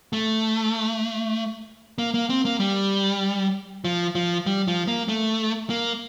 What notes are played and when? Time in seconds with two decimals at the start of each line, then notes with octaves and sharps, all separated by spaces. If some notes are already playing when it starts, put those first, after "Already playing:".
0.13 A3
1.98 A#3
2.14 A#3
2.29 C4
2.45 A#3
2.60 G3
3.85 F3
4.15 F3
4.46 G3
4.68 F3
4.88 A#3
5.08 A3
5.70 A#3